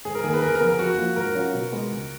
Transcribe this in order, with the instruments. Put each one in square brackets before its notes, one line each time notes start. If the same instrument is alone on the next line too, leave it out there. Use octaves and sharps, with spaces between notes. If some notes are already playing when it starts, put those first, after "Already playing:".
[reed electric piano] G#2 [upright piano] G#4
[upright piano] A#4
[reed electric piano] D#3 A#3 [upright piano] G#4
[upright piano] B4
[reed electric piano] F#2 [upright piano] A#4
[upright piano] A#4
[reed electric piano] F3 B3
[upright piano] A#4
[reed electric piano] F2 [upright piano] F#4
[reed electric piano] F3 A#3 F4
[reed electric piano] G#2 [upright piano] A#4
[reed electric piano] F#3 C#4 F4
B2
G#3 B3
C#2